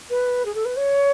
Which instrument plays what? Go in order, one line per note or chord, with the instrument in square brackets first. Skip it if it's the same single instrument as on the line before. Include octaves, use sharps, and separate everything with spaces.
[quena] B4
G#4
A4
B4
C#5